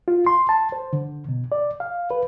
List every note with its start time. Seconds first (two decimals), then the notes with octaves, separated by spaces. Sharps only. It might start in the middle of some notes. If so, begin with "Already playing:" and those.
0.08 F4
0.27 C6
0.49 A5
0.72 C5
0.93 D3
1.29 B2
1.52 D5
1.80 F5
2.11 B4